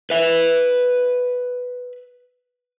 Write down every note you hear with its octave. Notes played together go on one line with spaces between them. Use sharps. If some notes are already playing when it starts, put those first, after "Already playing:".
B4 E5